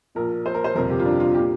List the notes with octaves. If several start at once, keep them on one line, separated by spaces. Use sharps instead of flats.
A#1 A#2 A#4
C5
A#4
C5
G1 F2 C3 A#4
G4
F4
D4
F4
G4
A#2